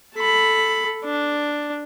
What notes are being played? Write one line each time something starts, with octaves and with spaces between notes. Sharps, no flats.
A4 B5
D4